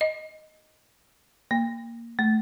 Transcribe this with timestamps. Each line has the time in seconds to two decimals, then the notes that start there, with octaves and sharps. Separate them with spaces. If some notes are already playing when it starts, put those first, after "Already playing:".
0.01 D#5
1.51 A#3
2.19 A3